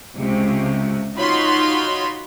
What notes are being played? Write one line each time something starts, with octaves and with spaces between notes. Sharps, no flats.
C#2 C3
D#4 F4 F#4 C#5 B5 C6